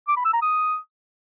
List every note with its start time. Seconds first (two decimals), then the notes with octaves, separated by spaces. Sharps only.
0.08 D6
0.16 B5
0.25 E6
0.33 A#5
0.42 D#6